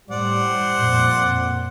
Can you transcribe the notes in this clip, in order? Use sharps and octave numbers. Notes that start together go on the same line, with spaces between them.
A2 G3 C5 D5 F#5
F2 A#2